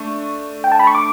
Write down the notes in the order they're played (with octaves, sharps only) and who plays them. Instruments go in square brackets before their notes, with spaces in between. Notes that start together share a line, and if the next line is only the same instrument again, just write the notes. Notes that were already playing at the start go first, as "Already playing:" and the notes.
Already playing: [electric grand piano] A3 D4 [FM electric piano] C#6
[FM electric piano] G5
A5
B5
C#6
D6